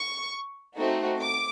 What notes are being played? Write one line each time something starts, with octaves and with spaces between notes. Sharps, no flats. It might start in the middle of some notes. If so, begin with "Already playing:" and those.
Already playing: C#6
A3 C4 D#4 F#4
D6